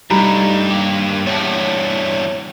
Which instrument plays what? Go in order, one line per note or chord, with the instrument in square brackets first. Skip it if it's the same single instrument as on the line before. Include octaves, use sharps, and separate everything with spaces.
[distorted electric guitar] G2 [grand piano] G3 [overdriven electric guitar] A3 D#4 [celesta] A#5 B5
[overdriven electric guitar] A#3 G4
[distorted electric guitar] E2 G2 [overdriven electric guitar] C#5 A5